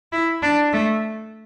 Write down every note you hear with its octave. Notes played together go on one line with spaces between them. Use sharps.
E4
D4
A3